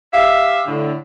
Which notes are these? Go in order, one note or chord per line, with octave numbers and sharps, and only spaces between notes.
G4 E5 F5
A2 D3